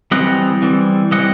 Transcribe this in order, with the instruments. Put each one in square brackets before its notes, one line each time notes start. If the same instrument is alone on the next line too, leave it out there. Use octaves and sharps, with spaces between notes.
[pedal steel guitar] E3 G3 C4 D#5 F#5
E3 G3 C4
E3 G3 C4 D#5 F#5